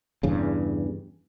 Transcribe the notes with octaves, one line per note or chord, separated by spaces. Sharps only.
E2 G2 C#3